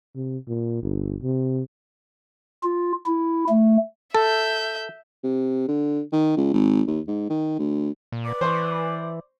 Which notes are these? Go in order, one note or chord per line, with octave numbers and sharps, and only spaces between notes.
C3
A#2
G1
C3
F4
E4
A3
A4 E5 G6
C3
D3
D#3
C#2
G#1
D#2
G#2
D#3
D2
A#2
B4 D5
E3 C5 C6 C#6